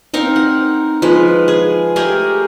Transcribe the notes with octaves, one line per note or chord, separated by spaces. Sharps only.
C4 D#4 A#4 F5
F#5
F3 G#3 B4
G#4
A3 G4 G#4 A#4